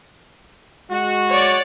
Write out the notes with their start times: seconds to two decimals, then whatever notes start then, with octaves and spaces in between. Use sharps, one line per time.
0.91 G#3 F#4
1.29 C#5 D5